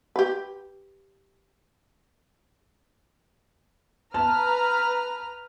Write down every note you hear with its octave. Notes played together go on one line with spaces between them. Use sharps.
G4 B4
B4 A5 A#5 F6